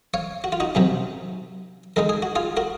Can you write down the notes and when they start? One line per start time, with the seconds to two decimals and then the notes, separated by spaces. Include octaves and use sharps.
0.14 C#5 F5
0.44 F#4
0.52 F4
0.60 D#4 F#4
0.75 C3 D#3 F#3 C#4
1.96 D#3 G#3 D#4 A#4
2.09 G#4
2.22 F#4
2.36 F4 G#4
2.57 F#4 A#4